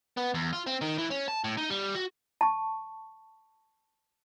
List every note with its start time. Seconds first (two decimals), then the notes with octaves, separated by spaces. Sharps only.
0.17 B3
0.34 E2
0.53 F4
0.67 C4
0.82 D#3
0.99 E3
1.11 C#4
1.28 A5
1.44 A2
1.57 D#4
1.70 G3
1.95 F#4
2.41 A5 C#6